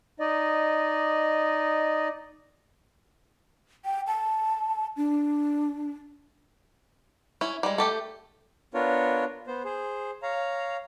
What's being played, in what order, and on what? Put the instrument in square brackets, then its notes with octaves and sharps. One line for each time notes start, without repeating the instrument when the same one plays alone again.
[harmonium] D#4 D5 D#5
[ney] G5
A5
D4
[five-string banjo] C#4 E4
G3 G#3
A3 G4 A4
[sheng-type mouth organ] B3 D4 F4 A#4 C#5
B3 C5
G#4 C5
C#5 F5 A#5